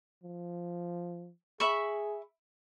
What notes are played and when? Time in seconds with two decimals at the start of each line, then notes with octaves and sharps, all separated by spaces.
0.23 F3
1.60 G#4 E5 B5 C#6